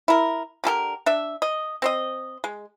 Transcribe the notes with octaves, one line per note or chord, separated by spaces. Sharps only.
E4 A#4
D3 G4 A4 A#4
D4 E5
D#5
C4 C5 D#5
G#3